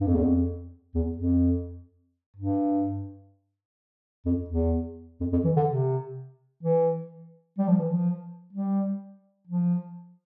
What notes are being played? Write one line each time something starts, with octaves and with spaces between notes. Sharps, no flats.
G2
F2
E2
F2
E2
F2
G2
F2
E2
F2
F2
E3
D3
C3
E3
G3
F3
E3
F3
G3
F3